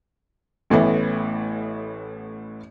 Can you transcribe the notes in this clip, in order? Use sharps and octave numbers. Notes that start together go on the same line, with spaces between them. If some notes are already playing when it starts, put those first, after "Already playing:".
A1 A2 E3 B3